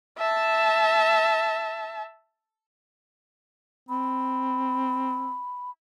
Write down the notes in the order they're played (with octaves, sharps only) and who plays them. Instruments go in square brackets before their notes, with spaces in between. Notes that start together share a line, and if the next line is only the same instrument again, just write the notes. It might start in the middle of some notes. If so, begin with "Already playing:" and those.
[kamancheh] E5 A5
[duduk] C4 [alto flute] B5